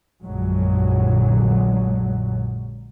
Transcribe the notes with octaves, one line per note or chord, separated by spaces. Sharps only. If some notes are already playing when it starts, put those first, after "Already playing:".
A#1 F#2 A#2 D3 F#3 G#3